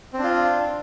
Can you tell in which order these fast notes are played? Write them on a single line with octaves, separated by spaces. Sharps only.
C4 D4 F4